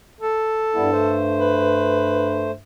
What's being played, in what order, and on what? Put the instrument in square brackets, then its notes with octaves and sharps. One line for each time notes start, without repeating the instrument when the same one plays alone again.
[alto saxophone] A4
[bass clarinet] G2 [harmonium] G3 B3 E4
[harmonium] A3 C5
[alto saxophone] B4